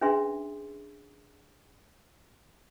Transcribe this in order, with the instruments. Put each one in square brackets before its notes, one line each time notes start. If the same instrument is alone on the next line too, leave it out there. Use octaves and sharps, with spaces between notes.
[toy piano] C#4 D4 G#4 B4 E5 C6